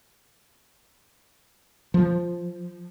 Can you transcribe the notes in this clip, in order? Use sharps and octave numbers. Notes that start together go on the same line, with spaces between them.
F3